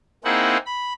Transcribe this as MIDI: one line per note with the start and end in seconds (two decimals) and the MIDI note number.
0.25 0.57 58
0.25 0.57 60
0.25 0.57 63
0.25 0.57 64
0.25 0.57 68
0.25 0.57 78
0.66 0.93 83